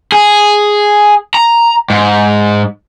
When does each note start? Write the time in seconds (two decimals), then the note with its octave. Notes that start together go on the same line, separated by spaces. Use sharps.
0.12 G#4
1.34 A#5
1.90 G#2